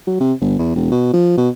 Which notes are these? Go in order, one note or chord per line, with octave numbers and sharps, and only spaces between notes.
F#3
C3
G1
E2
E1
B2
F3
B2